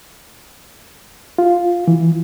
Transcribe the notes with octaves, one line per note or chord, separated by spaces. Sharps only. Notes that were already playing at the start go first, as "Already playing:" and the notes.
F4
E3